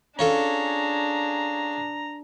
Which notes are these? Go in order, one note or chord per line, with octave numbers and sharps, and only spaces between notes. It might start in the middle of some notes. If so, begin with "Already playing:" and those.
C#4 D4 F4 G#4 A4 A#5